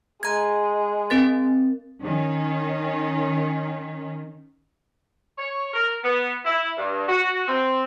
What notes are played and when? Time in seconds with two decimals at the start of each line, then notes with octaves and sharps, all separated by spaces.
0.23 G#3 A#5 G#6
1.10 C4 A#4 A6
2.03 D#3 C#4
5.38 C#5
5.73 A#4
6.04 B3
6.45 E4
6.78 G2
7.09 F#4
7.48 C4